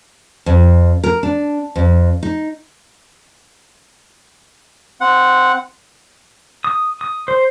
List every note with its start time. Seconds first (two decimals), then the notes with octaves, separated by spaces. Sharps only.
0.46 F2
1.04 A#4
1.23 D4
1.76 F2
2.23 D#4
5.01 C4 F#5
6.64 D#6
7.01 D#6
7.28 C5